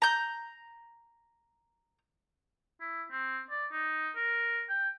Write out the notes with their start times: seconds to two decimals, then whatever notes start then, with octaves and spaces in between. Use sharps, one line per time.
0.02 A#5 G6
2.81 E4
3.11 C4
3.50 D5
3.72 D#4
4.16 A#4
4.69 G5